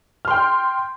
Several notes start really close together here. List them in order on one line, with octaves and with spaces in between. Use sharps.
F6 C6 G5